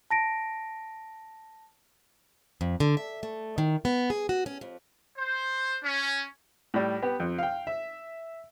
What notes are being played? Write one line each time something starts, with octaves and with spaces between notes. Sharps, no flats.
A5 A#6 D7
F2
D3
E5
A3
D#3
B3
G#4
F#4
C#4
F2
C5
C#4
A2 G3
B3 G4
F2
F5 G5
E5